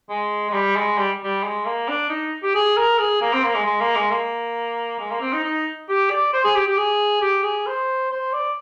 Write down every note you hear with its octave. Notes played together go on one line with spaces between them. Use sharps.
G#3
G#3
G3
G#3
G3
G3
G#3
A#3
D4
D#4
G4
G#4
A#4
G#4
A#3
C4
A#3
G#3
G#3
A#3
G#3
A#3
G#3
A#3
C4
D#4
D#4
G4
D5
C5
G#4
G4
G4
G#4
G4
G#4
C5
C5
D5